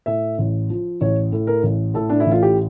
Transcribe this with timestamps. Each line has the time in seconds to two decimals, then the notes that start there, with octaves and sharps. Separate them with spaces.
0.06 A2 E5
0.38 A1
0.70 F3
1.01 A1 C#5
1.32 A2
1.47 A#4
1.63 A1
1.94 A2 A4
2.10 D4
2.20 E4
2.26 A1
2.31 F4
2.42 G4